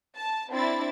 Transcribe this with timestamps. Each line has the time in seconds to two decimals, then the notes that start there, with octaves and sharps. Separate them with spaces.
0.16 A5
0.50 C4 D4 E4 A6